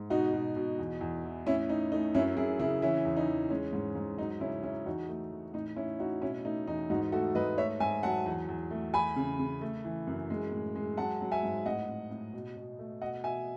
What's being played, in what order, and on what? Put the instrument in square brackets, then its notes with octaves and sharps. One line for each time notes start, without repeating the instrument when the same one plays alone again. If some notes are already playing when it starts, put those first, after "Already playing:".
Already playing: [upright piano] G#2
B2 D#4 F#4
B2
B2
E2
E2
E3
A2 C#4 E4
A2 D#4
A3 D#4
F#2 C#4 E4
F#2 E4 G#4
C#3 E4 G#4
E3 C#4 E4
E2
D#4
E2
G#3 C#4
G#2
G#2
F#3 D#4
C#3 C#4 E4
C#3 C#4 E4
E2 D#4 F#4
A3
E2
A2 D#4
A2 C#4 E4
A2 D#4 F#4
B2 C#4 E4
A3 D#4
E2 D#4
G#2 D#4 F#4
A3 F#4 A4
G#2 B4 D#5
A3 C#5 E5
G#2 E5 G#5
F#3 F#5 A5
E2
E2
A3
E2 G#5 B5
C#3
C#3
A3
E3
F#2
G#3
A2
G#3
F#3 F#5 A5
F#3
E5 G#5
G#2
A2 D#5 F#5
A2
A2
B2
B2
A3
B2 D#5 F#5
B2 E5 G#5